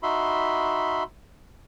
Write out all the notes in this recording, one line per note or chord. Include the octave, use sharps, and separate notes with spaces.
D#4 F#4 E5 B5 C6